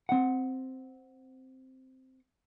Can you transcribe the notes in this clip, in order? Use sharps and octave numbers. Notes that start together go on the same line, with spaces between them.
C4 F#5